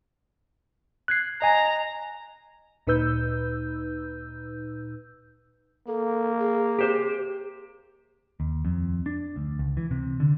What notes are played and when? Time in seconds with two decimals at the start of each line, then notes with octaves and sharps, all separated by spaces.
1.08 F#6 G#6 C7
1.42 D#5 G#5 A#5
2.87 D2 A#2 D#4 B4 E6 G6
5.87 A#3 A4
6.40 G#4
6.79 G4 C5
8.40 D#2
8.65 F2
9.06 D4
9.36 D2
9.59 C#2
9.77 E3
9.91 C3
10.20 D3